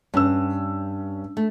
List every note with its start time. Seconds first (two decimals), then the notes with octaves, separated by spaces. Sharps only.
0.14 G2 C#4 E6
1.37 A3